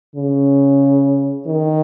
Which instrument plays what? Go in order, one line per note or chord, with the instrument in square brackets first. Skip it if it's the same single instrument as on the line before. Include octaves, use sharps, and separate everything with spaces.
[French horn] C#3
D#3